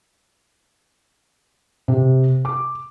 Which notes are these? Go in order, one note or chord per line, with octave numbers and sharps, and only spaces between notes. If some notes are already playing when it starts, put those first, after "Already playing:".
C3
D6